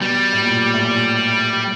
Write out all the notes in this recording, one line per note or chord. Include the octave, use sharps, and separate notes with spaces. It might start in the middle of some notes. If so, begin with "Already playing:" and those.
B2 G3
A2
A#2
A2
A#2